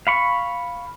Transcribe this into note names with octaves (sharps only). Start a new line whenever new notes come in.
F5 B5 C#6